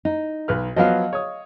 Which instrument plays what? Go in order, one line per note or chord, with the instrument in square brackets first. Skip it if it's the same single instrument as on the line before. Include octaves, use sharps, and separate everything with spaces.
[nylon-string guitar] D#4
[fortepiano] B1 B4 F6
[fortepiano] F3 F#3 B3 [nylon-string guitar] D#5 F5
[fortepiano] C#5 D#6